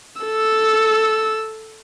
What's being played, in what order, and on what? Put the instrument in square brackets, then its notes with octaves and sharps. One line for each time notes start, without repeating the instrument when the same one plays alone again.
[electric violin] A4 E6